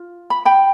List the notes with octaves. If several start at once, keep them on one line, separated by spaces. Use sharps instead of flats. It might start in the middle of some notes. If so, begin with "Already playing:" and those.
Already playing: F4
B5
G5 B5